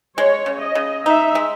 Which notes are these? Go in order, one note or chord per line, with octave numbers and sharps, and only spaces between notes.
G#3 C#5
C#3
D#5
C#3
D#4 E5
G#3